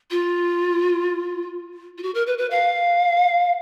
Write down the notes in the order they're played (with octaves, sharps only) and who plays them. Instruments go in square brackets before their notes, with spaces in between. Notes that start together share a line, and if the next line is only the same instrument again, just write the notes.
[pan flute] F4
F4
F#4
A#4
B4
B4
F5